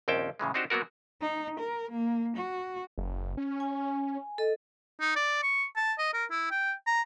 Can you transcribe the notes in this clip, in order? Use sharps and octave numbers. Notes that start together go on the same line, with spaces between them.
A#1 D#2 C4 C#4 G5 A5
A2 C#3 E3 G#3
C4 D4 D#4 F#4 G4 C5
F#3 A#3 B3 F#4 A#4
D#4
A#4
A#3
F#4
F#1
C#4
G#5
A4 D#5
D#4
D5
C#6
A5
D#5
A#4
E4
G5
A#5